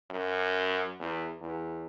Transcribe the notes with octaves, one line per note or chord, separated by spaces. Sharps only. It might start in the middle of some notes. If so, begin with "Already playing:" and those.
F#2
E2
E2